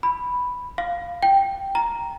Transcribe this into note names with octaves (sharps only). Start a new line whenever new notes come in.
B5
F5
G5
A#5